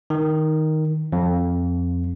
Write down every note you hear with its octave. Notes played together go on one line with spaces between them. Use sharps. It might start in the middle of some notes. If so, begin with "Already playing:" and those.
D#3
F2